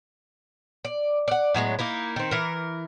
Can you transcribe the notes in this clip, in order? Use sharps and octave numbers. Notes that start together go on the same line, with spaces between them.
D5
D5 F#5
A2 F#3 G#3 B3
A#3 D#4 E4
D#3 C4
E3 A#4